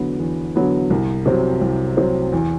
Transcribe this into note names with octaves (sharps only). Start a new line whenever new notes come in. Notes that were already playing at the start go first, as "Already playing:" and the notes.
Already playing: E2 D3 F#3 B3
E2
D3 F#3 B3
C2
C3 F#3 C4
C2
C3 F#3 C4
E2